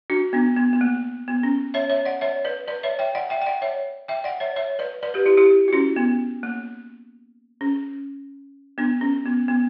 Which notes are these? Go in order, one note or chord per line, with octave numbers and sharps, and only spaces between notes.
D4 F#4
B3 D4
B3
B3
A#3
B3
C#4
C#5 E5
C#5 E5
D5 F#5
C#5 E5
B4 D5
B4 D5
C#5 E5
E5 G5
D5 F#5
E5 G5
G5
D5 F#5
C#5 E5
E5 G5
D5 F#5
C#5 E5
C#5 E5
B4 D5
B4 D5
G4 B4
E4 G4
E4 G4
F#4
C#4 E4
B3
A#3
C#4
B3 D4
C#4
B3
B3